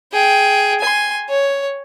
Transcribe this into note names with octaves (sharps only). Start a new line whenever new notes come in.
G#4 G5
G#5 C6
C#5